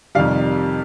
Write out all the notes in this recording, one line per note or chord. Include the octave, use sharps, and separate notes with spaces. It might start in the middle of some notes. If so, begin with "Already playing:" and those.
F2 C3 D#3 G3 F5